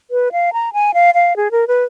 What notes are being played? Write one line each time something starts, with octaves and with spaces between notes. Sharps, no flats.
B4
F5
A#5
G#5
F5
F5
G#4
A#4
B4